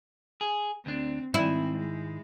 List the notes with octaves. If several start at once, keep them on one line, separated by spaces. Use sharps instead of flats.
G#4
D2 C4 D4
G#2 D#3 C4 E4
G#3